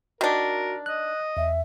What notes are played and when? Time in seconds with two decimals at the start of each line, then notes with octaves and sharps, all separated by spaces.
0.21 D#3 D4 F#4 A#4
0.86 D#5 F#6
1.37 E2 E5